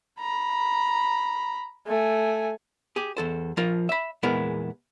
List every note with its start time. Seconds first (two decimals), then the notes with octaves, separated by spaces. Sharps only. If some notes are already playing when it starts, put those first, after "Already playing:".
0.20 A#5 B5
1.87 A3 G#5
2.96 G4 G#4
3.17 E2 A4 C5
3.57 F3 F4 A#4
3.89 E5 B5
4.23 E2 A#2 G#3 B3 E4 A#4